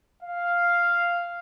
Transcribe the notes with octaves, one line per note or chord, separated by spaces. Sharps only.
F5